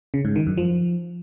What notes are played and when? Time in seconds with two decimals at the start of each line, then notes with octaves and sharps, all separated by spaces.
0.14 C#3
0.25 G#2
0.36 D#3
0.47 F#2
0.57 F3